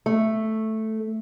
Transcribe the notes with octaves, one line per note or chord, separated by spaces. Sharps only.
A3